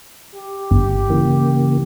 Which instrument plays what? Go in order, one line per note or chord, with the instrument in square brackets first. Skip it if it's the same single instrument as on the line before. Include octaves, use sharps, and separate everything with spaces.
[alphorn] G4
[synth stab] G1
[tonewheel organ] C#3 E3 A#3